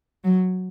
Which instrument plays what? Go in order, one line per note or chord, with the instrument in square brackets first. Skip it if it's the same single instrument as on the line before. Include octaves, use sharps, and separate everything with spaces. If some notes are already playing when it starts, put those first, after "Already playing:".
[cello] F#3